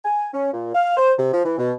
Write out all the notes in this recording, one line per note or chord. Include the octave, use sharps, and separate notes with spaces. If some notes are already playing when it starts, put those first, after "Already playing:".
G#5
C#4
A#2
F5
C5
C3
F3
E3
B2